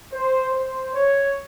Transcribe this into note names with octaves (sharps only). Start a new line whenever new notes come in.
C5
C5
C#5